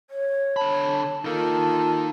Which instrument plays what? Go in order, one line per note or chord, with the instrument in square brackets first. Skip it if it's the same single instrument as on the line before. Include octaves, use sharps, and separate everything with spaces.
[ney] C#5
[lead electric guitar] D3 B5 [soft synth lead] A5
[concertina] A#3 A4 [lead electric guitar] D#4 A#4 [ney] F4